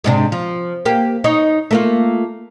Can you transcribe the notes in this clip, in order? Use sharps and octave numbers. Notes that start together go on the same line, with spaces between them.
G#2 C3 D4
F3
A#3 G4
D#4 C#5
A3 A#3 F4